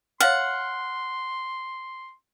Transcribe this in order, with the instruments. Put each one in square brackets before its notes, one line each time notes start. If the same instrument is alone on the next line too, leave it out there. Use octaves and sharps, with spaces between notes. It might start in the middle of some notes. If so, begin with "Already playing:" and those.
[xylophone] C#5 F5 A6 [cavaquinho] F#5 [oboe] C6 [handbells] F6